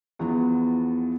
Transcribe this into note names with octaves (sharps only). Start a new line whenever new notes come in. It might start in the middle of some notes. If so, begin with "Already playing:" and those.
E2 E3 F3 B3